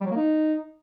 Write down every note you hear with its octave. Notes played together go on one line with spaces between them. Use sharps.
G3
F#3
A#3
D#4